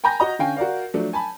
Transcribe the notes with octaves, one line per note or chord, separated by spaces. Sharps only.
G5 G#5 A#5 B5 G6 A#6
F#4 D#5 A#5
D3 C#4 F5 G5 G#5
F#4 A#4 D5 F5
F3 F#3 A3 D4
G#5 A5 B5